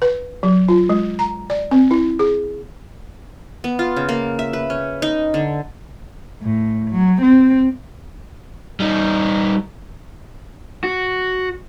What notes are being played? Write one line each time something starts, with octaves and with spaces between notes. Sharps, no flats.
B4
F#3
F4
G#3
A#5
D5
C4
E4
G#4
B3
F4
C#3
A#3
E5
B4
C#4
D#4
D3
A2
F#3
C4
G3 D#4
F#4